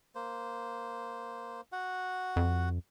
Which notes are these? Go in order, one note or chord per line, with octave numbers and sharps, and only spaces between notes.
A#3 C5
F#4 F#5
F2